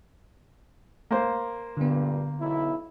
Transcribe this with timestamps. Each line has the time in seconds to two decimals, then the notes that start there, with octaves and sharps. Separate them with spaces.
1.11 A#3 C5
1.77 D2 G2 A#2 D3 B3
2.40 B1 E4